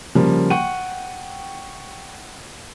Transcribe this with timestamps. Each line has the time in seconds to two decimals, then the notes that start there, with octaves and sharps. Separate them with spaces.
0.15 C#3 F3 G3 A#3
0.50 F#5 G5 C#6 D#7